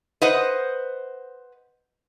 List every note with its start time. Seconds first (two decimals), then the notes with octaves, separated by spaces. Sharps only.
0.22 B4 C5 D#5 F#5